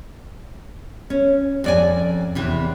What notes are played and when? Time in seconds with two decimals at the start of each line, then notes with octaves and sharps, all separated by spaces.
1.10 C#4
1.64 F2 D5 G#5
2.35 E2 C3 E3